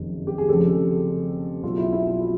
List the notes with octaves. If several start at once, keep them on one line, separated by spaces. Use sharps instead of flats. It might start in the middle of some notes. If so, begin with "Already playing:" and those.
Already playing: F#1 F2 C3 D#3
G4
G#4
F1 F2 C#3 G4 A4
B1 B2 F#3 B3 F4
E4
E4
F4
E4 F#4